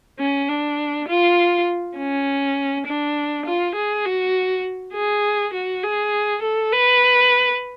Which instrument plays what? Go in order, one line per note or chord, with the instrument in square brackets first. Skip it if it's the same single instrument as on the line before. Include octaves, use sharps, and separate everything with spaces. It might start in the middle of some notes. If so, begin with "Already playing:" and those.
[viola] C#4
D4
F4
C#4
D4
F4
G#4
F#4
G#4
F#4
G#4
A4
B4